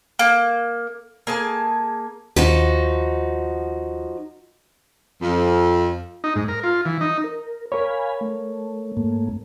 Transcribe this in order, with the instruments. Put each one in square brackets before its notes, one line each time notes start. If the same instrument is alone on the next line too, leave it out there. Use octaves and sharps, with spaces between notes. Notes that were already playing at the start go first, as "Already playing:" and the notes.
[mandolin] A#3
[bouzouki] A#3 G#4 A5
[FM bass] D#2 [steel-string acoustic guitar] F3 D#4 F#4
[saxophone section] F2
[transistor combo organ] D#4
G#2
A#4
F4
E3
D#4
[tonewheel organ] A#4
[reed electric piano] A#4 C#5 [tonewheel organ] F5 G#5 B5
[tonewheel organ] A3
G#2 A3 A#3